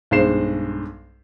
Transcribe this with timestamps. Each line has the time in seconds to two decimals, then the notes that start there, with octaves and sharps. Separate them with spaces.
0.11 B1 G2 G#3 C5 C7 E7